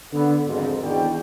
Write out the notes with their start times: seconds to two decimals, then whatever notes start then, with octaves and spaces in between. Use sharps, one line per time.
0.13 D3 B3
0.47 G#1 F2 G#2
0.82 G#1 E2 B2 D4 G5